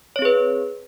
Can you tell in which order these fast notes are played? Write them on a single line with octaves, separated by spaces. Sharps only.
C#5 C4 G#4 B4